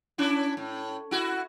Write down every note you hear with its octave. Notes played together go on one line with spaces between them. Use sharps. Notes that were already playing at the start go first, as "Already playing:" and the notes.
C#4 D4 E4
A2
E4 F#4